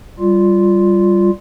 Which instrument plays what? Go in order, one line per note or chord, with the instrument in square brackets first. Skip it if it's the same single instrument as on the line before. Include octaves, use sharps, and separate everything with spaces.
[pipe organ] G3 F4